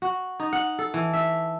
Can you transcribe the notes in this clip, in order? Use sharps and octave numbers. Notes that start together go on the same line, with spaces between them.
F#4
D#4
F#5
A4
E3
E5